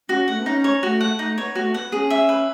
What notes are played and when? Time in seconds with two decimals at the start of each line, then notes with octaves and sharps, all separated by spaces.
0.09 C#4 F#4
0.27 A3 F#5
0.39 B3
0.46 C#4 D#4
0.64 C#5
0.83 A3 F#4
1.01 F#5
1.19 A3 D#4
1.37 B3 C#5
1.55 A3 F#4
1.73 B3 F#5
1.92 C#4 G#4
2.10 E5
2.29 B4